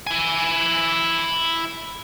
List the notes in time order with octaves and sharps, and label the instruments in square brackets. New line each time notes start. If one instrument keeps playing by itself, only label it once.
[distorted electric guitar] E4 G#5